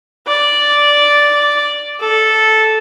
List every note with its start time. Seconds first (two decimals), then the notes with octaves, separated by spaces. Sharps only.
0.27 D5
2.01 A4